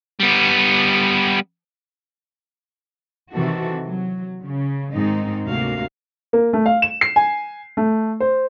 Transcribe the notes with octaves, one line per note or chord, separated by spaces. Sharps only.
G3 B3
C3 D#3 E3 F#4 A4
F#3
C#3
G#2 D#3 G#3 C4 D#4
D2 C3 A#3 F#4 F5
A#3
A3
F5
E7
C7
G#5
A3
C5